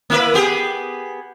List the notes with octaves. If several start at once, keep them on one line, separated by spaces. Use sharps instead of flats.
A#3 E4 B4
B3 G4 G#4